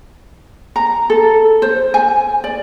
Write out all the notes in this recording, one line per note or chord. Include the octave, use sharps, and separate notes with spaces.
A#5
A4
C5
G#5
D5